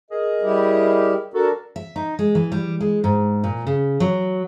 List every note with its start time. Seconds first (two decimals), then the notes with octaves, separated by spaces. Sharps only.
0.11 G#4 A#4 D#5
0.42 G3 E4 G4
1.34 D4 F#4 A4 A#4
1.76 E5
1.96 D#4
2.19 G#3
2.35 E3
2.52 G3
2.81 G#3
3.04 G#2
3.44 A#2
3.67 C#3
4.00 F#3